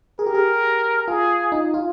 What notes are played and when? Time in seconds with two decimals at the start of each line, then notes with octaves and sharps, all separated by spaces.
0.19 G#4 A#4
0.26 G4
0.34 G#4
1.07 F4 G#4
1.52 D#4
1.74 F4